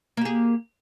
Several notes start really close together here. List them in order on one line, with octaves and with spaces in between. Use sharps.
A#3 G4 G#4